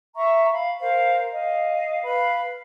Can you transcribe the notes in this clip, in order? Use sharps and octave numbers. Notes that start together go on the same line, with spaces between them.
E5 A#5 C#6
F5 B5
A#4 C5 F5
D#5 F5
B4 F5 B5